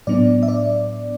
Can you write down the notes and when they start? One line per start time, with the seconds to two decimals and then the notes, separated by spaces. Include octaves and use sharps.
0.07 A2 F#3 B3 D4 D5
0.43 E5
0.48 D5